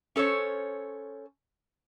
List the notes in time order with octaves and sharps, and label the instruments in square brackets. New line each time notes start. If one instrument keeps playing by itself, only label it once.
[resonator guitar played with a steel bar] C#4 A4 C5 C#5